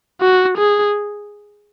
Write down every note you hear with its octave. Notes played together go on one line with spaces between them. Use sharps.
F#4
G#4